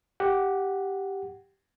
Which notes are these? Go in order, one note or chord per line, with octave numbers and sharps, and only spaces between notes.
G4 F#5